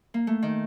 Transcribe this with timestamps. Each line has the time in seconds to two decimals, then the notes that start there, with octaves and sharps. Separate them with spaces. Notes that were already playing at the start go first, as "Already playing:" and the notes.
0.14 A#3
0.27 A3
0.42 D#3